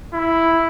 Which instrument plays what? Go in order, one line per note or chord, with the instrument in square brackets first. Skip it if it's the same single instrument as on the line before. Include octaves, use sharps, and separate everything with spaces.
[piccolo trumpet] E4